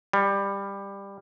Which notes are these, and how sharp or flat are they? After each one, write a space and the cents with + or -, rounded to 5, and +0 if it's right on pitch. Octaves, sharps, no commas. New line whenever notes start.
G3 +15